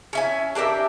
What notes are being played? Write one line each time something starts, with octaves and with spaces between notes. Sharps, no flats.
C#4 E5 G#5
D4 G4 A#4 E5